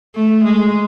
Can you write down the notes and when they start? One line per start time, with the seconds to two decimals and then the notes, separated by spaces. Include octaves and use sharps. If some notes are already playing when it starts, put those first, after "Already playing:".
0.15 A3
0.45 G#3